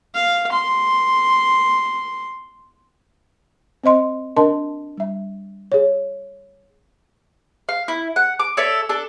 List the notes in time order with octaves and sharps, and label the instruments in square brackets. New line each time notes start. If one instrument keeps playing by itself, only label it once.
[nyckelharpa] F5
C6
[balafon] C4 C5 D#5 C6
D4 A#4 D#5 A5 C6
G3 E5
G#4 C#5
[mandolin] F5
E4
F#5
D6
A4 C#5 D5 E5
D4 A4